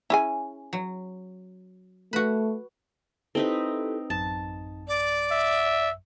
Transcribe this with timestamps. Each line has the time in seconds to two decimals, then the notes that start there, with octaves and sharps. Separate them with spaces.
0.10 C#4 E4 G#4 G#5
0.73 F#3
2.13 A3 F#4 B4
3.35 C4 D#4 E4 G4 A4 B4
4.10 A1 F#2 A5
4.88 D5
5.32 E5